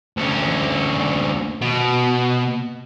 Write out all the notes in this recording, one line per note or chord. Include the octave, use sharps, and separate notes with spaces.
D2 C#4
B2